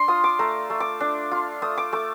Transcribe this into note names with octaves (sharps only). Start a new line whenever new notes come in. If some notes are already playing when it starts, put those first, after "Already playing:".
Already playing: D4 C6
F4 D#6
D6
A3 A#5
A3
D6
D4
F4
A3 D#6
D6
A3 D6